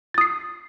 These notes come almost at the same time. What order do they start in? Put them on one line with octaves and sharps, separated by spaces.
A6 D#6 C7